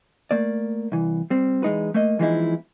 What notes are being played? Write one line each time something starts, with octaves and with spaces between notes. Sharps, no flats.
A3 A#3 D5
C2 E3
G3 C4
E2 G#3 D#4 B4
A3 A#3 D#5
E3 F3 G#3 B3 D#4 E4